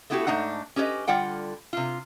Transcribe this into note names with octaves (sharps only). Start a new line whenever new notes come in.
A3 B3 E4 F#4 G4 A4
G#2 A3 D4 D#4 F#5
C#4 G4 B4 C#5 D#5
D3 G3 F4 F#5 G5
C3 F4